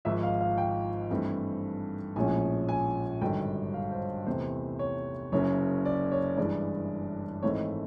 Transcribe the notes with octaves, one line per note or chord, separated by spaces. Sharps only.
G#1 G#2 F3 E5
F5
F5
G5
G2 E3 A3 C4
A#1 A2 F3 G#3 C#4 G#5
G#5
G#1 G2 D3 F#3 G5
F5
C5
E2 C3 E3 A3 C5
C#5
F#1 F#2 C#3 C#5
D5
C#5
G2 E3 G#3 D5
G#1 G#2 E3 A3 C4 C#5